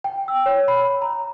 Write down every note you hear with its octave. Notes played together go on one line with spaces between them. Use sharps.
G5
E6
C#5
B5
A#5